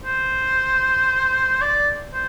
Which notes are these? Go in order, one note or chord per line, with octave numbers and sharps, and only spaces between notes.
C5
D5
C5